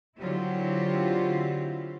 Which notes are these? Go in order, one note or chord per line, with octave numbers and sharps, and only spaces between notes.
D3 F#3 C4 E4 F4 G4